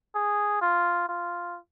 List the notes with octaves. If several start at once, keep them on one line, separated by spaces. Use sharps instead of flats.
G#4
F4
F4